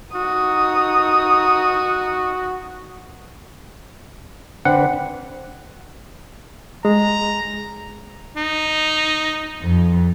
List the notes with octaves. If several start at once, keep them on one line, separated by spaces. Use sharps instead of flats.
D#4 F#4 D#6
D3 C4 D4 B4 F#5
G#3 A#5
D#4
F2